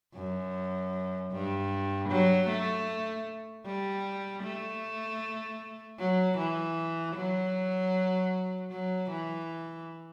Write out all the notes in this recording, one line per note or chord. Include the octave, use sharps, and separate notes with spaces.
F#2
G2
F#3
A3
G3
A3
F#3
E3
F#3
F#3
E3